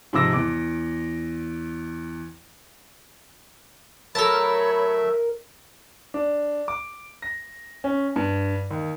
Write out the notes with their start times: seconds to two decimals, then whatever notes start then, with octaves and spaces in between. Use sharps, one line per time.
0.13 G#2 C3 F3 D6 E6 A#6
0.33 E2 D6
4.15 F#3 A3 A4 A#4 C#5 E5 A5 B5
6.14 D4
6.68 D6
7.22 A#6
7.84 C#4
8.16 G2
8.71 D#2